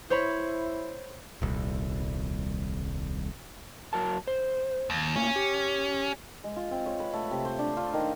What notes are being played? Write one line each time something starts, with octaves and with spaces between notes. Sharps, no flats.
E4 C5 C#5 B5
D#1 C2
F#3 A#4 A5
C5
D#2
A2 A#3 C#4
G4
G#3
F4
C4
C#5
B4
A3
C3
C5
D4
F4
D#3